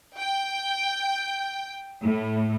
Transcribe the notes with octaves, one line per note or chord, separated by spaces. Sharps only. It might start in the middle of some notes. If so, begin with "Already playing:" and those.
G5
A2